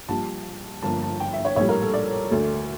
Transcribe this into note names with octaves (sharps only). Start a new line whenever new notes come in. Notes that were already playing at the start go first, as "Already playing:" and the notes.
A#1 A#2 G3 A5
G1 G2 F3 A#3 A5
A5
G5
E5
C#5
A#1 A2 G3 C#5
A#4
A4
D5
D2 D3 A3